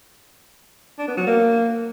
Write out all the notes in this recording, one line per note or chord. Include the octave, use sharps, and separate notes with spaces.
D4
B3
F#3
A#3